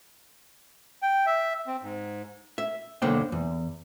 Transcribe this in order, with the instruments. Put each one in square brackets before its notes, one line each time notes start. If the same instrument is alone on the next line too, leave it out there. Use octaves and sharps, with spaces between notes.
[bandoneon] G5
E5
C4
G#2
[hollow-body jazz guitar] E5
B1 D3 A#3 C5 G5
E2